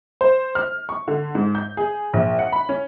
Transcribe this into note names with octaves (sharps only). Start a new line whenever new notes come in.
C5
F6
C#6
D3
G#2
G6
G#4
A#1
F#5
B5
C#4